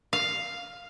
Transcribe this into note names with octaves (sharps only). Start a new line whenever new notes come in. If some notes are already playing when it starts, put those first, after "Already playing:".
F5